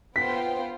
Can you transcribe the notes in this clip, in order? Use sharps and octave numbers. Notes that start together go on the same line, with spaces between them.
B3 F4 C5 G5 B6